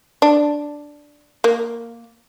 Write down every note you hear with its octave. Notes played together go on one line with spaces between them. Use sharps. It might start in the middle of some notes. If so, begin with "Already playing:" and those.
D4
A#3